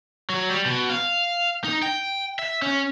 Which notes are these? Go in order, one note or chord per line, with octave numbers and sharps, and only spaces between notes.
F#3
G3
B2
F5
D#4
G5
E5
C#4